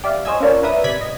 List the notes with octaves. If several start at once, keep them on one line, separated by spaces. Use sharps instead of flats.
G4 D5 E5 F5
C5 C#5 D#5 G#5 E6 G#6
C#4 D4 F4 A#4 C#5 D5
A#4 B4 D5 E5 D#6
G#1 C3 D5 B5 G#6 B6
D#5